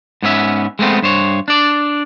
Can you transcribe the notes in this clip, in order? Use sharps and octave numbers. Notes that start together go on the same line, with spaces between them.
G#2 B3 C#4 E5
G#3 A3 B3 C4
G2 C5 C#5
D4 D5